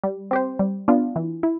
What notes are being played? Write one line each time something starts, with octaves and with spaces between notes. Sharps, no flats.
G3
C4 G4 C5
G3
B3 D4 F4
E3
E4